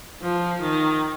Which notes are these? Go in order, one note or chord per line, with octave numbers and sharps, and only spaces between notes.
F3
D#3